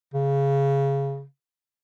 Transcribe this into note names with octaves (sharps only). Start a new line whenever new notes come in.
C#3